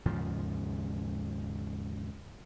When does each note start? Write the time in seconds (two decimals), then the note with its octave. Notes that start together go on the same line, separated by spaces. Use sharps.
0.06 D#2 G#2 C#3 F3